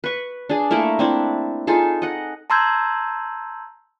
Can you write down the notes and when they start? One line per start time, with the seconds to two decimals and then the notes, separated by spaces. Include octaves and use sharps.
0.04 B4 C#6
0.49 D4 G#4
0.71 A3 A#3 E4 A#4
0.99 C4 D4 E4
1.67 D#4 F4 G#4 A4
2.02 D#5 F#5
2.50 A5 A#5 C6 E6 G6 G#6